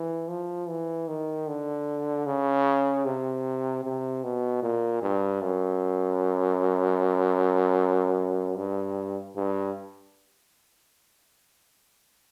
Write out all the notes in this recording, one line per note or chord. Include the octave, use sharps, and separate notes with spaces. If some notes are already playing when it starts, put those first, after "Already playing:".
Already playing: E3
F3
E3
D#3
D3
C#3
C3
C3
B2
A#2
G2
F#2
G2
G2